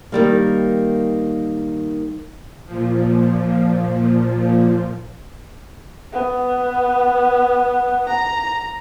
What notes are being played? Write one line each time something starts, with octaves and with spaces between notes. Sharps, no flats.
D#3 G3 A#3
A#2 F3
B3
A#5